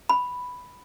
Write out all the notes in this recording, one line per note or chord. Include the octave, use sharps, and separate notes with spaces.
B5